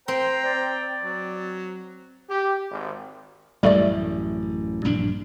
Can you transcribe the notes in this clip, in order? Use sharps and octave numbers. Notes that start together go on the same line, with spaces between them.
C4 C5 G5 A#5
D5
F#3
G4
G#1
A1 F#2 G3 A3 D5
A#1 G2 D4